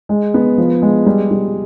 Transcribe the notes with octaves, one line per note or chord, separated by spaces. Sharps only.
G#3
B3
F3
G#3
G3
G3